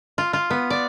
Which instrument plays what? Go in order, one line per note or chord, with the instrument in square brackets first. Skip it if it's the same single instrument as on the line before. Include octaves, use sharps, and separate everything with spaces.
[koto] F4
F4
B3
D5